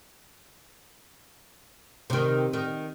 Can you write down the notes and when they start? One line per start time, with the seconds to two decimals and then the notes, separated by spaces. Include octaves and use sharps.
2.10 C3 D#3
2.53 D#3